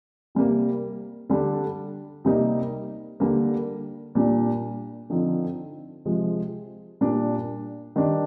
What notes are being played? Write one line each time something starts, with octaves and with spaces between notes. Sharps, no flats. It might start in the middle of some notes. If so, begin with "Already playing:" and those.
C3 G3 A#3
D3 G3 D4
C3 G3 A#3 D#4
D3 G3 A#3
A#2 G3 D4
D3 F3 C4 D#4
C3 F3 G#3
A#2 G3 A#3 D4
D#3 G3 D4